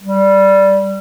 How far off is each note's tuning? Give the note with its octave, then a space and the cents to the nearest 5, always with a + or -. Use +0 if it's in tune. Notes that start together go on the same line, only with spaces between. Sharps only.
G3 -10